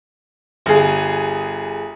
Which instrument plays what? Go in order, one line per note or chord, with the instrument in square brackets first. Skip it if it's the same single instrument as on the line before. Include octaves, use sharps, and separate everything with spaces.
[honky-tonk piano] G1 G#4